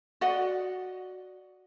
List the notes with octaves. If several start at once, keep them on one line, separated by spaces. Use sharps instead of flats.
F#4 D5 D#5 F#5